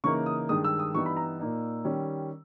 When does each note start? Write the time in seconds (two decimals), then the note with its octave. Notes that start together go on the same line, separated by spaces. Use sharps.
0.04 C#3 E3 A#3 D#4 C#6
0.26 D#6
0.49 G2 D#3 G#3 D#6
0.64 E6
0.79 D#6
0.94 G2 E3 G3 B3 D#4 C#6
1.06 B5
1.17 A#5
1.39 A#2 A#3 D#4
1.85 D#3 G3 C#4